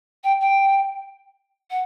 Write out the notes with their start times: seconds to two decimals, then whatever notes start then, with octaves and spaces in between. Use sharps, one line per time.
0.23 G5
0.40 G5
1.70 F#5